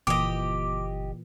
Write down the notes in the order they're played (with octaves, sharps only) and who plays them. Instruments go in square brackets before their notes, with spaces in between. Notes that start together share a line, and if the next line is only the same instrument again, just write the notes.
[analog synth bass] F#1 [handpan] A#2 E3 [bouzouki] G4 D#5 [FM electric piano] D6